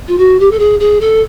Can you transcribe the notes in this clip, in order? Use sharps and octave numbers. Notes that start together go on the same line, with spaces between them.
F4
F#4
G4
A4
G#4
G#4
A4